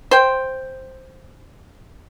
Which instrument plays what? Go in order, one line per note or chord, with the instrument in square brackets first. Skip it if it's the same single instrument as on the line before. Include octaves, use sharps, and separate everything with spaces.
[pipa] C5 G5